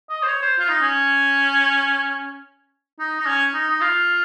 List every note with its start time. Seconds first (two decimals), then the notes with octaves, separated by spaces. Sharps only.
0.10 D#5
0.23 C5
0.28 C#5
0.42 C5
0.59 F4
0.69 D#4
0.82 C#4
3.00 D#4
3.20 D#4
3.27 C#4
3.54 D#4
3.70 D#4
3.81 F4